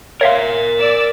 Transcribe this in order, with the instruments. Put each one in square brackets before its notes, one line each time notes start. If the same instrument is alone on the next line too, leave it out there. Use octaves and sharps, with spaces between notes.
[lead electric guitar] A#4 C6 [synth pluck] C#5 E5 F5
[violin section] D5 E6